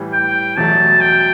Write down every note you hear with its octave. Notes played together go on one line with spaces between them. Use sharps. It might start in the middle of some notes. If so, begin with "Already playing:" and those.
Already playing: A2 E3 G3
G5
E2 B2 F#3 A3 A5
G5